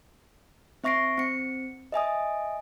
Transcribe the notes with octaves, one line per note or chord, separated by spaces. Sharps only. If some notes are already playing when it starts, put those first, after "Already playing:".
C4 E5 C#6 A#6 C7 D7
C4 C#7
D#5 E5 G#5 D#6